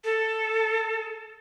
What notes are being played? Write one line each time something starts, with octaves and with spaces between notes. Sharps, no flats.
A4